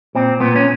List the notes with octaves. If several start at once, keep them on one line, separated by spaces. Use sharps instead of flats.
A#2 C4
A#2 B3
C#4